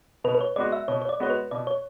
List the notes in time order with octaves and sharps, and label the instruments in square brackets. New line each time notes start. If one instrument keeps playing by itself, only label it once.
[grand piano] B2 [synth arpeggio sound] B4
[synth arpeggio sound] B4
C#5
[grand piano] G#3 B3 F#4 [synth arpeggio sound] D5
[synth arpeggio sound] E5
[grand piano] B2 [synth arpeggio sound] C#5
[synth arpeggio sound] C#5
D5
[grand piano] G#3 B3 F#4 [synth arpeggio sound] C#5
[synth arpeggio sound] B4
[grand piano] B2 [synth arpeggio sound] D5
[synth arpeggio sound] C#5